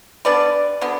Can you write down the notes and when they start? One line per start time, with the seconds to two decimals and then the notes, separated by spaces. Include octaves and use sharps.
0.25 D3 G3 B3 D4 B4 D5
0.81 D3 F#3 B3